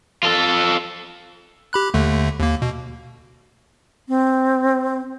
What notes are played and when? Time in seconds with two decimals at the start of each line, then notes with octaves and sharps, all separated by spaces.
0.23 F4 A4
1.73 G4 B5 F#6
1.94 D#2 D3 A3
2.40 D#2 A#3
2.62 B2
4.08 C4